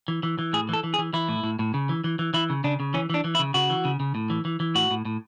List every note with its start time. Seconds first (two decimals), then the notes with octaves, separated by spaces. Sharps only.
0.08 E3
0.23 E3
0.39 E3
0.53 A2 G#4
0.69 E3 A4
0.84 E3
0.94 G#4
0.99 E3
1.13 E3 E4
1.29 A2
1.44 A2
1.59 A2
1.74 C#3
1.89 E3
2.04 E3
2.19 E3
2.34 E3 E4
2.50 C#3
2.64 C#3 D4
2.80 C#3
2.94 E3 C#4
3.10 E3 D4
3.24 E3
3.35 E4
3.39 C#3
3.54 C#3 F#4
3.70 E3
3.85 C#3
4.00 C#3
4.15 A2
4.30 E3
4.45 E3
4.60 E3
4.75 A2 F#4
4.91 A2
5.05 A2